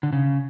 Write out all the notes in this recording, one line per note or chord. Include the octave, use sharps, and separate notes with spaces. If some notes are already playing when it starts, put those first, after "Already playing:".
D3
C#3